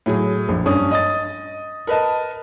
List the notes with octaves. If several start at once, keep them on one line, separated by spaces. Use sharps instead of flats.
A2 F#3 G#4
A#1
G2 C#4 D4 D#6
D#5 D#6 A6
A#4 B4 D#5 A5